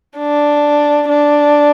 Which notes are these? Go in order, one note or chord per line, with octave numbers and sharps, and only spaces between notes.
D4
D4